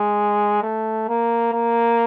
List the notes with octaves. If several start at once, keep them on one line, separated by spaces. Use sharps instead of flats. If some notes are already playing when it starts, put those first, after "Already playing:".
Already playing: G#3
A3
A#3
A#3